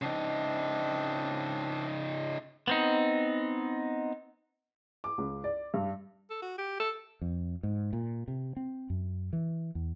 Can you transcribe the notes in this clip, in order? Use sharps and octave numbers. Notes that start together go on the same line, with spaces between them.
C#3 C4 D4 D#4
B3 C4 D#4
D6
C#2
D5
G2
A4
F#4
G4
A4
F2
G#2
A#2
C3
C4
F#2
E3
E2